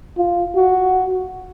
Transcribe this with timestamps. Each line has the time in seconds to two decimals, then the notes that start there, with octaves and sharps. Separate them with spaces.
0.18 F4
0.56 F#4